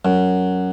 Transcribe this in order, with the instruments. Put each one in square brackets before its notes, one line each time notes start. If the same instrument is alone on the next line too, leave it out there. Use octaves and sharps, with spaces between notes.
[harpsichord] F#2